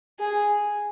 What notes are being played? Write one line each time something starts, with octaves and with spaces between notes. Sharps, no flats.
G#4